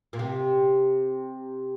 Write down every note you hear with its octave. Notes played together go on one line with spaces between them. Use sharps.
A#2
C3